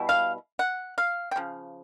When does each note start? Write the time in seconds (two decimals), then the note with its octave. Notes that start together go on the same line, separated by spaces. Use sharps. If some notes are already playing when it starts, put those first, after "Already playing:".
Already playing: B2 G3 E4
0.09 F5
0.59 F#5
0.98 F5
1.31 G5
1.36 C#3 F3